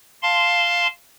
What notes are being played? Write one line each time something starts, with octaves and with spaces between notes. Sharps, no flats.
F5 A5 C6